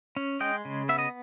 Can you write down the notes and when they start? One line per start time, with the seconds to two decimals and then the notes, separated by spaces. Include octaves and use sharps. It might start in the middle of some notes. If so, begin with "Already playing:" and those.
0.16 C#4
0.40 G#3 D#5 G5
0.65 C#3
0.89 B3 E5
0.99 D#5